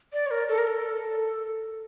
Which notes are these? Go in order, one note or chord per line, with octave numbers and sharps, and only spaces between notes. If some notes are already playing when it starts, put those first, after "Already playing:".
D5
C#5
A#4
A4
A#4
A4